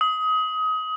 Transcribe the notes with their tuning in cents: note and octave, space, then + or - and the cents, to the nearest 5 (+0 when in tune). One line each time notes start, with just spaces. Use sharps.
D#6 +25